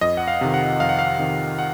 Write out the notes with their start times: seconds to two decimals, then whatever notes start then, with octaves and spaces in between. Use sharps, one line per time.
0.01 F2 D#5
0.17 F#5
0.28 F5
0.41 C3 D#3
0.54 F#5
0.80 F2 F5
0.89 F#5
0.99 F5
1.19 C3 D#3
1.58 F#5